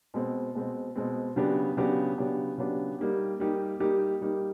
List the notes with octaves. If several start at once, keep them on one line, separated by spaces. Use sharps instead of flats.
B2 G#3 C4
B2 G#3 C4
B2 G#3 C4
C#3 F#3 B3 D4 G4
C#3 F#3 B3 D4 G4
C#3 F#3 B3 D4 G4
C#3 F#3 B3 D4 G4
G3 A#3 D#4 G4
G3 A#3 D#4 G4
G3 A#3 D#4 G4
G3 A#3 D#4 G4